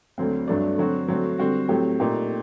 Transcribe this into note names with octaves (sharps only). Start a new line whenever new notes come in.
D2 D3 F#3 C4
G2 F#3 A3 D4
D3 F#3 C4 F#4
D3 F#3 A3 C4 F#4
D3 G3 C4 F#4
A2 F#3 A3 C4 G4
A#2 A3 D#4 G4